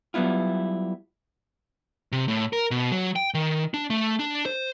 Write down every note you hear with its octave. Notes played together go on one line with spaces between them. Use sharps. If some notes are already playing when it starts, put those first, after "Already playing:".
F#3 G3 B3 E4 F4
C3
A2
A#4
B2
F#3
G5
D#3
D4
A3
D4
C5